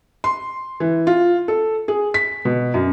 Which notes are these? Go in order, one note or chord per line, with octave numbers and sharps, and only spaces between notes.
C6
E3
F4
A4
G#4
B6
B2
F#2